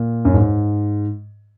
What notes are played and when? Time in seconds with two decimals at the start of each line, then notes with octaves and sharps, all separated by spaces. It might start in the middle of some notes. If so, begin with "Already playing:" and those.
Already playing: A#2
0.25 F#2
0.34 G#2